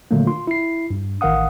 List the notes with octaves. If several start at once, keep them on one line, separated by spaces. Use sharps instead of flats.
A#2 D3 D#3 F#3 A3 A#3
F4 C6
E4 C7
G2
A1 D#3 A#4 F5 F#5 D#6